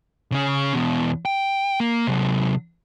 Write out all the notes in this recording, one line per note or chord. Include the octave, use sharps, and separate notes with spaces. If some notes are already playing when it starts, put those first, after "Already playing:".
C#3 C#4
E2 B2
G5
A#3
C3 F#3